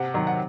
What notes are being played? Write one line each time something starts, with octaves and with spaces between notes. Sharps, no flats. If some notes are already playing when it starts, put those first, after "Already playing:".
Already playing: C3 F#5
D#3 F#3
F#5